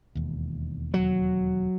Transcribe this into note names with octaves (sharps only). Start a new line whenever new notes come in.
E1 D#2
F#3